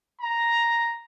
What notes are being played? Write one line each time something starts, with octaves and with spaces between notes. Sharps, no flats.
A#5